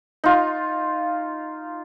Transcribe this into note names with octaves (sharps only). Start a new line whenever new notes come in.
D#4 F4